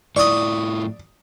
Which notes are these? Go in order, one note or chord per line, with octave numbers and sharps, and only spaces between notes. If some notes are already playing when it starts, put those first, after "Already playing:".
A2 E4 F4 D5 C#6 D#6